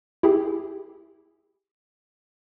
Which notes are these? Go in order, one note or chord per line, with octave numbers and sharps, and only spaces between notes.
E4 G4 G#4